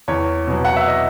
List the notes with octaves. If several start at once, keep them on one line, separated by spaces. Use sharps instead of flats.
E2 C#5
B2 F#3
F#5
E5
D#5